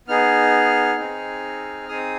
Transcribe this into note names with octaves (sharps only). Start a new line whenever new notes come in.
B3 D#4 G#4 F6
C4 D#4 G#4
C4 D#4 G#4 D#6